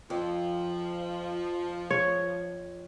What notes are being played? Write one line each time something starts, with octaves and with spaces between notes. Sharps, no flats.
F2 F3
C#5